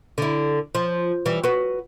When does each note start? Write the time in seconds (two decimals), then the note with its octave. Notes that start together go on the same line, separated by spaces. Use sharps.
0.18 D3 E4
0.75 F3
1.26 E3 G3
1.44 F#4 B4